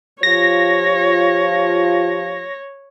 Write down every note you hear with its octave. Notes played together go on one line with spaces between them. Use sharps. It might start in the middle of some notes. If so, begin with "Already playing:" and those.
F3 F4 G4 C#5 A#6